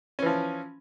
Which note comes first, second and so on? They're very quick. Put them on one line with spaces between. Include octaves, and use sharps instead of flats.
C#4 E3 F3